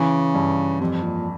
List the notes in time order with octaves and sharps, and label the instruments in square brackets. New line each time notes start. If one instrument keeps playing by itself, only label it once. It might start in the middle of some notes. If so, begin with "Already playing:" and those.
Already playing: [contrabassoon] C#3 [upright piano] E3
[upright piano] G2
[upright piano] F2 [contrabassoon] C3
[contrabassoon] A#2